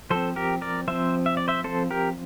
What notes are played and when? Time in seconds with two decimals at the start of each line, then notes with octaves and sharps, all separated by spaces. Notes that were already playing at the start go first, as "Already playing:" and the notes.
0.10 F3 C4 A4 C5
0.36 G4 A#4
0.62 A#4 D5
0.88 F3 C4 C5 E5
1.26 E5
1.37 D5
1.48 C5 E5
1.64 F3 C4 A4 C5
1.90 G4 A#4